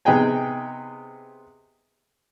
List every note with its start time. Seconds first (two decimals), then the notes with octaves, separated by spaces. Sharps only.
0.05 C3 B3 D#4 G#4 G5 G#5